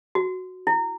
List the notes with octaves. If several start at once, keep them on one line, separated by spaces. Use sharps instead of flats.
F#4
E4